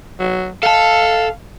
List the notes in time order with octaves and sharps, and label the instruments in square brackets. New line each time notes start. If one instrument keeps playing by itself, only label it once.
[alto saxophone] F#3
[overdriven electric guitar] A4 A5 [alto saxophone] F5